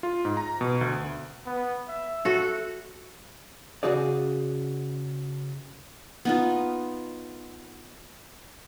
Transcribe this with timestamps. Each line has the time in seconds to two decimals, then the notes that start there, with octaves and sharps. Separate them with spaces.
0.03 F4
0.25 G#2
0.37 A#5
0.61 B2
0.81 D2
1.46 B3
1.89 E5
2.25 F#4 A4
3.83 C#3 F#4 G#4 D5
6.25 B3 D#4 F4